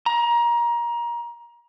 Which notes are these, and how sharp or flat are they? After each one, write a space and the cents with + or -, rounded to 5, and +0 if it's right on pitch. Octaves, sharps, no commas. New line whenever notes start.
A#5 +25